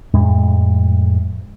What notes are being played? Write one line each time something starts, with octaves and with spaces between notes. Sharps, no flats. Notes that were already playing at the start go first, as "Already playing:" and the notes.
F2 A2 G#3